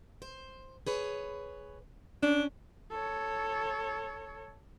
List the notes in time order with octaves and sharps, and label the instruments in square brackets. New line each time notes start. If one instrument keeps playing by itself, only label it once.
[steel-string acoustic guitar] C5
G#4 B4 C#5
[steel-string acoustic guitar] C#4 [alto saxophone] D4
[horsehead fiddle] A4 C#5